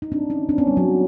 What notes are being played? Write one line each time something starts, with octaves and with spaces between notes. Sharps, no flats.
D#4
C4 D4
C#4 D#4
C4 D4
B3 C#4
G3
F#3